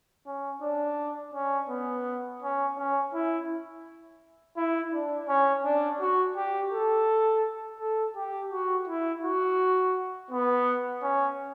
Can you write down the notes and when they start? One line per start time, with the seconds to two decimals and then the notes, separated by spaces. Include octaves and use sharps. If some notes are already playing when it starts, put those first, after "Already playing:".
0.27 C#4
0.62 D4
1.34 C#4
1.69 B3
2.42 C#4
2.77 C#4
3.14 E4
4.57 E4
4.93 D4
5.28 C#4
5.64 D4
6.00 F#4
6.36 G4
6.72 A4
7.80 A4
8.16 G4
8.51 F#4
8.88 E4
9.24 F#4
10.31 B3
11.02 C#4